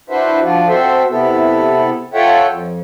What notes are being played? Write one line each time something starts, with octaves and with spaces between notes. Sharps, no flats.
D4 E4 F#4 B4 C5 E5
F3 D4 F4 F#4
C4 F#4 A4 C5 E5
C3 B3 E4 A4
F4 A4 C#5 E5 F#5 G5
F2